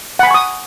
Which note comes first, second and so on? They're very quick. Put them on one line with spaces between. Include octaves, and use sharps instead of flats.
F#5 B5 G#5 C#6 D#6